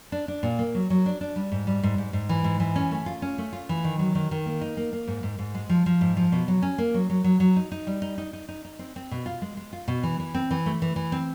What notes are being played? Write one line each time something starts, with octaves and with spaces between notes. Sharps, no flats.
D4
D4
A#2
A#3
F#3
F#3
D4
D4
G3
G#2
G3
G#2
G#2
G#2
E3
G#2
E3
C#4
A3
F4
C#4
A3
F4
E3
D#3
F#3
D#3
D#3
A#3
D#4
A#3
A#3
G#2
G#2
G#2
G#3
F3
F3
G#2
F3
B2
F#3
C#4
A#3
F#3
F#3
F#3
F#3
D#4
D#4
G3
D#4
D#4
D#4
D#4
D#4
C4
C4
B2
F4
G#3
G#3
F4
B2
E3
E3
C4
E3
A3
E3
E3
C4